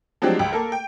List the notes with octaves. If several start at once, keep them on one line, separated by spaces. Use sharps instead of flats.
F3 F#3 G#3 C4 D4 G4
C#2
A#3 A4 A#4
G5